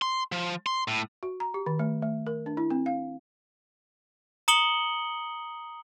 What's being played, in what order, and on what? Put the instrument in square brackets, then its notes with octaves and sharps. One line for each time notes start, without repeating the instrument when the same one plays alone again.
[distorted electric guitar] C6
F3
C6
A2
[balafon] F#4
A#5
G4
D#3
A3
A3
A#4
D4
E4
C4
F5
[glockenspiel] A#5 D#6 C#7 F#7 G7